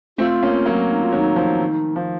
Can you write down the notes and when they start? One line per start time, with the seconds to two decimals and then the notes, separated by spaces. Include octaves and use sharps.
0.18 A3 C4 F4
0.43 A#3 C#4
0.66 F#3 A#3
0.90 D#4
1.04 F4
1.13 D#3 F#3
1.18 D#4
1.36 F3
1.60 D#3
1.96 F3